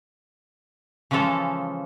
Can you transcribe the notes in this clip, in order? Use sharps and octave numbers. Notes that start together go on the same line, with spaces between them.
C#3 E3 F3 G#3 A4